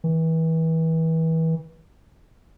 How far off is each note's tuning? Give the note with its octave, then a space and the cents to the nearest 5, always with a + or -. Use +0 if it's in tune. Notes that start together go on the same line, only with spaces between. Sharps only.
E3 -30